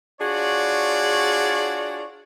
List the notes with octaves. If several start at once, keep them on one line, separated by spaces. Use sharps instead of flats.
D4 F4 F#4 G#4 C#5 D5